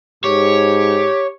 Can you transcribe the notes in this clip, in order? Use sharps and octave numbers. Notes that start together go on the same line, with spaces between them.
G#2 G4 C#5